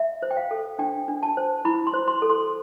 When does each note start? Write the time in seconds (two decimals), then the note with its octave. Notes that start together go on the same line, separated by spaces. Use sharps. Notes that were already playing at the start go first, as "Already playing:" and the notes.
Already playing: E5
0.22 C5
0.31 G5
0.37 F5
0.51 A4
0.79 D4 G5
1.08 D4
1.23 A5
1.37 C5
1.65 E4 B5
1.87 C6
1.94 C5
2.08 C6
2.22 A4
2.30 C6